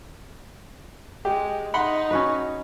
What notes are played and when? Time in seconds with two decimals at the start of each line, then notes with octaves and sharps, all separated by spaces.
1.25 G#3 G4
1.74 D#4 F#5 B5 C6
2.11 C#4 F#4 B4